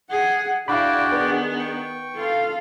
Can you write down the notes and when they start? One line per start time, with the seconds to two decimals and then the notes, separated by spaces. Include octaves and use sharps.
0.10 G#4 F#5
0.68 D4 E4 F#4 G#4 D5 F5 G5 B5
1.12 D#3 B3 B4
1.59 G5 C#6
2.16 F4 A4 F5